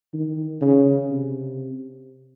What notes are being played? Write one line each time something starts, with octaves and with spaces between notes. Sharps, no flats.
D#3
C#3
C3